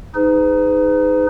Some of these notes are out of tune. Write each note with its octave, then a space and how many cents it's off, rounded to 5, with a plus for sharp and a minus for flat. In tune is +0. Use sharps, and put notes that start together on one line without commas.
D#4 +0 G#4 +0 B4 +45